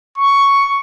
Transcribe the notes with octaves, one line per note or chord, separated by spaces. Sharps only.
C#6